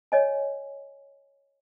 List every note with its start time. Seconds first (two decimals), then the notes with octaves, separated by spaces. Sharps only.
0.12 C#5 D#5 G#5